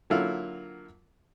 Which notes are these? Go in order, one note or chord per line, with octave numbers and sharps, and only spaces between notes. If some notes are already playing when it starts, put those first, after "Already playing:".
D3 F#3 A#3 E4 F4